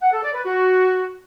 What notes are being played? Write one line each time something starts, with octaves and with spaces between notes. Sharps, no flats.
F#5
A4
D5
B4
F#4